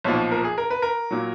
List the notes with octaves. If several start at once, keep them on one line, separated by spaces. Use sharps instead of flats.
B1 A#2 F3 C#5
A#4
G#4
A#4
B4
A#4
A#2 F#3